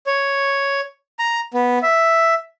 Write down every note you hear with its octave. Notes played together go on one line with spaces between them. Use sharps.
C#5
A#5
B3
E5